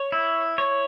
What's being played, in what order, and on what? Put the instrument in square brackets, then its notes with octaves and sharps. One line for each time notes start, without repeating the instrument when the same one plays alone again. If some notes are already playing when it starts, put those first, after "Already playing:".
Already playing: [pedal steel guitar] C#5
E4
C#5